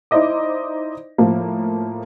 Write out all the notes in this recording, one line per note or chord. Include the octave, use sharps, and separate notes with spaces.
D#4 E4 C5 D5 D#5 D6
A2 F3 A#3